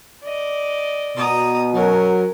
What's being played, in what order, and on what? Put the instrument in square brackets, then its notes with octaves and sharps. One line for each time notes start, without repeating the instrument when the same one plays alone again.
[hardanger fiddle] D5 D#5
[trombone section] B2 [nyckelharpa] A#5 D#6
[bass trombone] F#3 [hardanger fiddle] C#4 [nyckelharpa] A#4